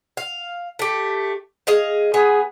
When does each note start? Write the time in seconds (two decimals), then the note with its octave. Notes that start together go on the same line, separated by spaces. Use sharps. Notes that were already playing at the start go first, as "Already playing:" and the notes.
0.17 F5
0.79 A3 G4
1.67 G#4 D#5 F5
2.14 B3 G#4